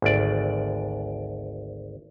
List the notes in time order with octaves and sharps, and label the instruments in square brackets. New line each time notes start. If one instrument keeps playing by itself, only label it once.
[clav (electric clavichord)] G#1 D2 D5